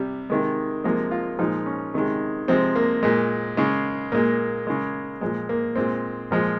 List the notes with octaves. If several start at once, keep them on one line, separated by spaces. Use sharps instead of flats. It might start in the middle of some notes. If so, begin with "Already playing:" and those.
Already playing: C3 G3
C3 D#3 G#3
C3 F3 G#3 A#3
F4
A#2 F3 G#3 D#4
C#4
C3 D#3 G#3
C3 F3 G#3 C4
A#3
A#2 G#3
C#3 G#3
A#2 G#3 A#3
C#3 G#3
A#2 F3 G#3
A#3
A#2 G#3 C4
A#2 F3 G#3